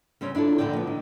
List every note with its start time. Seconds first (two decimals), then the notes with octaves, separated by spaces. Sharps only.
0.21 C#3 G3 C4 C#4
0.35 D4 E4 F4 A4
0.58 D#2 A#2 D3 F3 D5 G5
0.73 F3 B3
0.87 D#3